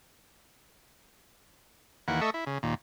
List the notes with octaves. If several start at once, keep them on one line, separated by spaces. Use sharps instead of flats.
D#2 E3 A#3 F#5
A3 A4 D#5 E5 C#6
E4
C#3
D#2 A#2